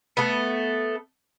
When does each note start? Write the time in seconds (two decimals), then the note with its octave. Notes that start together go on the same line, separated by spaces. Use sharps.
0.17 A3 B3